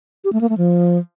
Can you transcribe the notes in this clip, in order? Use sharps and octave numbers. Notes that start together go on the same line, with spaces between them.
G4
A3
A#3
A3
F3